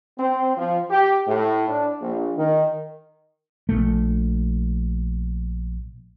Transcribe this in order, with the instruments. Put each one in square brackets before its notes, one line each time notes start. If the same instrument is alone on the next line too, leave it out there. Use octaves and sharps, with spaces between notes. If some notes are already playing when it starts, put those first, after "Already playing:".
[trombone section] C4
F3
G4
A2
D4
A#1
D#3
[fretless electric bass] A#1 A3